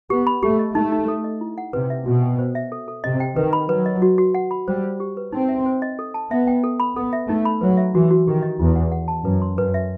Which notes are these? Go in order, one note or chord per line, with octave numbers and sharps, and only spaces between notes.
B3 G4
B5
A3 G4
D#5
A3 D#4
D#4
A4
D#5
E4
F#5
C3 B4
E5
B2 F#4
G5
C5
E5
A4
A4
C3 D#5
G5
D#3 B4
B5
F#3 B4
D#5
F#4
F#4
F#5
B5
G3 C5
C5
G4
B4
C4 D#4
E5
C5
D#5
A4
A5
B3 E5
G5
A4
B5
B3 A4
E5
A3 D#4
B5
F#3 B4
E5
E3 F#4
F#4
D#3 G4
D#5
E2 E4
F#5
F#5
A5
F#2 B4
C6
F#2 B4
E5